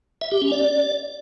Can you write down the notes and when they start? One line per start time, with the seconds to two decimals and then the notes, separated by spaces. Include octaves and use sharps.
0.21 E5
0.32 G4
0.42 C#4
0.52 D5